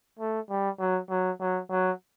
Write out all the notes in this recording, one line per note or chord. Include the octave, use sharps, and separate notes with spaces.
A3
G3
F#3
F#3
F#3
F#3